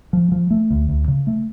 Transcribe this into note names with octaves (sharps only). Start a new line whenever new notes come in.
F3
F3
A3
D2
D2
C#3
A3